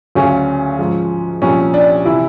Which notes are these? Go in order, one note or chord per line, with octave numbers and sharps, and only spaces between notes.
D2 C#3 F#3 C#4
G#2 F3
C2 A#2 F3 C#4
D4
C3 E3 E4